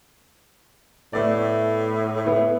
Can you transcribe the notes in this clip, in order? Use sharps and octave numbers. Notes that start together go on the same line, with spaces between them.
A2 A3 B3 D5
B3 E4